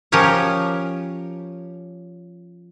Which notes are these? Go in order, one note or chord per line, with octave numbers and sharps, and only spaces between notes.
F3 C#4 G4 A#4 C#5